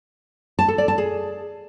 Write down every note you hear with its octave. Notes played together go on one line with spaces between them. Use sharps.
A5
A4
D5
A5
G#4